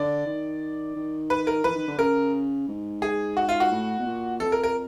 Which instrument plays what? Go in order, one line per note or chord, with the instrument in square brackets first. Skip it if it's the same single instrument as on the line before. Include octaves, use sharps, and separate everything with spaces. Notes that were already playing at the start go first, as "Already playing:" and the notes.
Already playing: [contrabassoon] D3 [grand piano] D5
[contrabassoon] D#3
D#3
[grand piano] B4
A#4
[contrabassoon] E3 [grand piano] B4
[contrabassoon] D#3
D3
[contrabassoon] C#3 [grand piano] A#4
[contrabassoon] G#2
[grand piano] G#4
F#4
F4
F#4
[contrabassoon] A2
B2
A#2
[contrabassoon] F2 [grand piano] A4
[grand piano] A#4
A#4